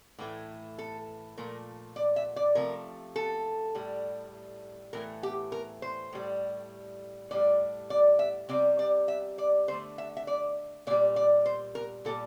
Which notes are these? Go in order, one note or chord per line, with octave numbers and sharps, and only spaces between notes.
A2 E3 A3
A4
A#2 F3 A3 A#4
D5
E5
D5
C3 F3 A3 A#4
A4
A2 G3
A2 E3 A3 A#4
G4
A#4
C5
A2 G3
A2 G3 D5
D5
E5
C3 G3 D5
D5
E5
D5
D3 A3 C5
E5
E5
D5
A#2 G3 D5
D5
C5
A#4
A#2 G3 A4